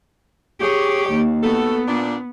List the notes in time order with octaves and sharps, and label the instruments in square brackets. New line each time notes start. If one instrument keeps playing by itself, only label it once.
[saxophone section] G4 [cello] G#4 C#5
[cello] D#2
[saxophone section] A3 F#4 A4 [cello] B3
[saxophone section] A#2 D4